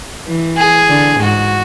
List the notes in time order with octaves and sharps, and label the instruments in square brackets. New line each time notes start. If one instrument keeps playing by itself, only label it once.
[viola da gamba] E3
[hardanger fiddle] G#4
[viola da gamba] D3
[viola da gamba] G#2 [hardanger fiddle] F#4